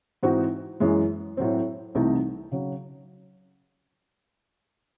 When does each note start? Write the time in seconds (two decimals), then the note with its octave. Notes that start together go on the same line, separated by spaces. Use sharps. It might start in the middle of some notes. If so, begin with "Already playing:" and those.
0.23 G#2 E3 C4 D#4 F#4
0.80 F#2 E3 G#3
1.37 A2 F#3 C4
1.95 C2 C3 E3 A3 D#4
2.52 C#3 F#3